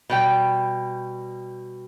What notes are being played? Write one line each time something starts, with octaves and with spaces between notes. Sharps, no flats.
B2 G3 G5